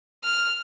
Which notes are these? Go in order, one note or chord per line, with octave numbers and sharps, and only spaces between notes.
F6